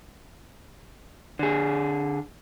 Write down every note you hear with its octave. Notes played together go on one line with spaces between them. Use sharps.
D3 G#4